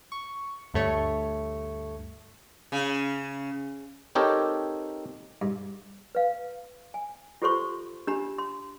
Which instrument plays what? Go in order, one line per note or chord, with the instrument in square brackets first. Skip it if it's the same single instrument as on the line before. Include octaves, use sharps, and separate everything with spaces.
[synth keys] C#6
D2 G2 A3 C#5
[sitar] C#3
[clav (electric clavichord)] C4 D#4 G4 A4 A#4 C#5
[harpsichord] G2
[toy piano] B4 F5
G#5
F4 G4 A4 C5 C6 C#6
D4 G4 A#5 B5
C6